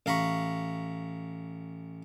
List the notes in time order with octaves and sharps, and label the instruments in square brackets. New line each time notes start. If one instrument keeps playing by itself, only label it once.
[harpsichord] A1 F5 A#5 B5 C#6